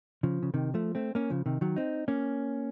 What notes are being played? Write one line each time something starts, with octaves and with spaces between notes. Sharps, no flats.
C#3 F3
C#3
C3 D#3
F3 A3
A3 C4
A#3 C#4
C#3 F3
C3 D#3
D#3 F#3
C4 D#4
A#3 C#4